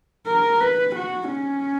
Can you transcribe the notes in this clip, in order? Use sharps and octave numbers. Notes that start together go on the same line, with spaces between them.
A#4
B4
F#4
C#4